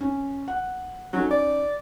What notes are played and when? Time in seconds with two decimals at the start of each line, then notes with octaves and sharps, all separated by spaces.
0.01 C#4
0.48 F#5
1.13 F#3 C#4 D#4 A4
1.31 D5